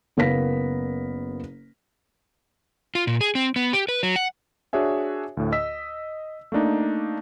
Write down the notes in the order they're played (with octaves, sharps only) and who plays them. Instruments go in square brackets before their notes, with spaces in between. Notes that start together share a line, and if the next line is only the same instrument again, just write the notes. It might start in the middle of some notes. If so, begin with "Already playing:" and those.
[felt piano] F#1 B3 A#4 F5 A#6 B6
[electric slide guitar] F4
A#2
G#4
C4
B3
G4
B4
F#3
F#5
[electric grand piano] D4 F#4 G#4 C#5 E5 G#5
D2 A2
D#5 E6 B6
A3 A#3 D4 D#4